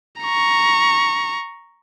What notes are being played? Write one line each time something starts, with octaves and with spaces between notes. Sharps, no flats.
A#5 C#6